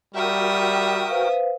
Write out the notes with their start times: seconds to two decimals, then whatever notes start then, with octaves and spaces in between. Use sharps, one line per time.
0.15 G3 F#4 A#4 E5 G5 D#6
1.09 B4 C5 F5